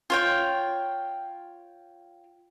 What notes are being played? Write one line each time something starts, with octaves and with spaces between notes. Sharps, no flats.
F4 C#5 G5